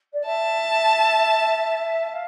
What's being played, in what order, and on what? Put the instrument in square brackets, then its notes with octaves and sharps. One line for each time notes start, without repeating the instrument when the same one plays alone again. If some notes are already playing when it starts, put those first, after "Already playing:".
[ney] D5
[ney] E5 [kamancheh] A5
[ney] F5